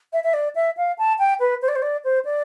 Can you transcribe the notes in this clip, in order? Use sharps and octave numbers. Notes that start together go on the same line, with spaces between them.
E5
E5
D5
E5
F5
A5
G5
B4
C5
D5
C5
D5
C5
D5